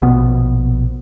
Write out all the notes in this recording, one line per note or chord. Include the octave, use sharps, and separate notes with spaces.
A#1 B2 B3